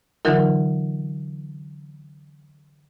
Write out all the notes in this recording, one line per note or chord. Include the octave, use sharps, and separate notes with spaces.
D3 E3 F#3 D#4 F4 A#4